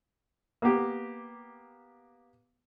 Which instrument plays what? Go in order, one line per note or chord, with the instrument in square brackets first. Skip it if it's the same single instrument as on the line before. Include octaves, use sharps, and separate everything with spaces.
[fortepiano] A#3 B3 G4